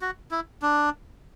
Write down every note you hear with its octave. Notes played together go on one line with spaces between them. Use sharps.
F#4
E4
D4